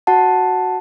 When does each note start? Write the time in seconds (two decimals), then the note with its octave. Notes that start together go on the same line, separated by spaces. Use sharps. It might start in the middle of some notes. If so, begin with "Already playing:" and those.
0.07 F#4 F#5 A5